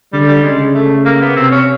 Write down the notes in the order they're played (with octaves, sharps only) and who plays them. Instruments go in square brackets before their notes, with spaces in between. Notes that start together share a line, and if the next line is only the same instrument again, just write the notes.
[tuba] D3 [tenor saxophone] G3
[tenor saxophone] G3
[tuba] C#3 [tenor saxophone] G#3
[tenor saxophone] A3
A#3
B3
[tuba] C3 [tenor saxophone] C4
[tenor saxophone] C#4